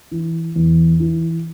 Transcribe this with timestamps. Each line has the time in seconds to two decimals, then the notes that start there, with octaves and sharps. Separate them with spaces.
0.11 E3
0.56 E2
1.00 E3